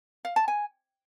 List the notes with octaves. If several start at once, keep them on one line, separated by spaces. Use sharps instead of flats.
F5
A5
G#5